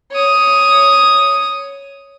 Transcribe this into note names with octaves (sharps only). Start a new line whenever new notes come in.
C#5 D#6